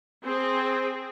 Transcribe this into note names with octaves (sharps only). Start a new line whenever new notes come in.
C4 G#4